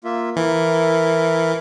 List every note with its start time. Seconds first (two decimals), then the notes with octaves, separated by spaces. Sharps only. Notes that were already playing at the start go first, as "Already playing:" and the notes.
0.04 A#3 F4 E5
0.36 E3 E4 A#4